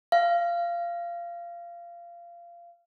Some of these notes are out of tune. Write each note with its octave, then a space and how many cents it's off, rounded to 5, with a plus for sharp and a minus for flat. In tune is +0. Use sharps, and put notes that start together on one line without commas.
F5 -20